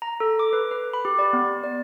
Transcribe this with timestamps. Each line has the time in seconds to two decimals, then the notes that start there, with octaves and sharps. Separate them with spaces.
0.02 A#5
0.20 A4
0.39 D6
0.53 B4
0.71 B4
0.93 B5
1.05 G4
1.19 D5
1.33 B3
1.64 D5